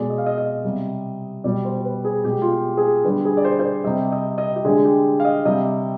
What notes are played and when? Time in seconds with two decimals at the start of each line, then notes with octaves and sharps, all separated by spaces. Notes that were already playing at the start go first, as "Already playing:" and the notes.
Already playing: B2 G#3 D5
0.10 D#5
0.18 F5
0.26 D#5
0.38 D#5
0.64 C3 G3
1.44 B2 G3 D5
1.65 C5
1.77 C5
1.84 B4
2.05 G#4
2.24 B2 G#3 G4
2.42 F4
2.52 G4
2.77 G#4
3.04 D3 G3 B4
3.25 G#4
3.37 D5
3.45 C5
3.59 C5
3.64 D5
3.84 C3 G3 D#5
4.12 D#5
4.38 D#5
4.56 G4
4.65 D3 G#3 G#4
4.85 G4
5.20 F5
5.25 D#5
5.45 C3 G3 D#5